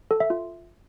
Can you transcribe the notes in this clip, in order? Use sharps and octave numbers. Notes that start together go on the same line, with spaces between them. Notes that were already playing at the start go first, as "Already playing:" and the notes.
A4
E5
F4